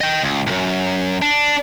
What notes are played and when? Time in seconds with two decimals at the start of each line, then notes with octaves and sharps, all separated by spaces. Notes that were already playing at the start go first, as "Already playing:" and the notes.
0.01 D#5 G5
0.22 C#2
0.47 C2 F#2
1.22 D4